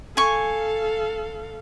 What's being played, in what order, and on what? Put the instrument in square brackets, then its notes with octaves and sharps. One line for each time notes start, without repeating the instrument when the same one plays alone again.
[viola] A4 F5 [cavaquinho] G#5 C#6